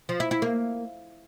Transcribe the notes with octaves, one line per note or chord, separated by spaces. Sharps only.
F3
E4
E4
A#3